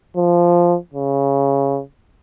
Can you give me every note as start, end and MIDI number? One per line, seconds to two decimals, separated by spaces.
0.16 0.76 53
0.94 1.80 49